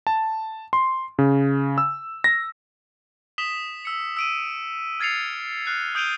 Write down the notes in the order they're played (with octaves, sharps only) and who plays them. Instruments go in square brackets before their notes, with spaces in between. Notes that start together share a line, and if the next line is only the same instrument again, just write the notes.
[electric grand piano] A5
C6
C#3
E6
A#6
[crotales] D#6 B6 E7 G7
E6 C#7
E6 D7 D#7
F6 G#6 A6 C7 C#7 F7
F6 F#6 C7
D#6 G6 D7 D#7 F7 G7